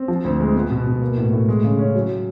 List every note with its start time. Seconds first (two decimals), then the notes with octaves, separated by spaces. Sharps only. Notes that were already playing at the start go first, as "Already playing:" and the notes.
Already playing: C4
0.08 F3
0.24 D2
0.40 G#3
0.54 B3
0.70 B2
0.87 B2
1.02 A#3
1.17 A2
1.33 A2
1.48 G#3
1.64 C#3
1.79 C#4
1.95 F#3